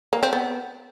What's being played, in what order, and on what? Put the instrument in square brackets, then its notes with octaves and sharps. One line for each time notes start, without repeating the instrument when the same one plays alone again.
[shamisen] A#3
C4
B3